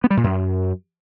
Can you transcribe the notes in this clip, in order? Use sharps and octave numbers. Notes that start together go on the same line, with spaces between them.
B3
G3
A#2
F#2